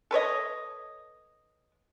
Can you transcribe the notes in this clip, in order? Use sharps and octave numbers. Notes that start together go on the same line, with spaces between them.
A4 B4 C#5 D#5